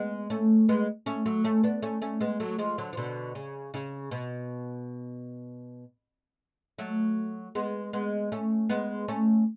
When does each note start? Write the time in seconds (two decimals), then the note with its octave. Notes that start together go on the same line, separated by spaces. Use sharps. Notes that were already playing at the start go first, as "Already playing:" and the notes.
Already playing: G#3 B3
0.30 A3 C#4
0.69 G#3 B3
1.06 A3 C#4
1.26 F#3 A3
1.44 A3 C#4
1.63 B3 D4
1.82 A3 C#4
2.02 A3 C#4
2.21 G#3 B3
2.40 F#3 A3
2.58 F3 G#3
2.78 D3 F#3
2.93 F3
2.97 B2 D3
3.35 C#3
3.74 C#3
4.11 B2
6.78 F#3 A3
7.55 G#3 B3
7.93 G#3 B3
8.32 A3 C#4
8.70 G#3 B3
9.08 A3 C#4